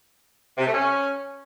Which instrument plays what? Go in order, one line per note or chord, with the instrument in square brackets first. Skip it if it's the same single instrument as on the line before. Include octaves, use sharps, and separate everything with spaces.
[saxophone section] C3
A3
C#4